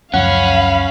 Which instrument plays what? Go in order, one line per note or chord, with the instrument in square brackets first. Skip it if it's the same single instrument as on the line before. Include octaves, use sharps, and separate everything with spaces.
[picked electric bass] C#2 F#2 F3 [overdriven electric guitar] C#4 C#5 [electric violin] F5 B5 [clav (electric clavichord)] F#5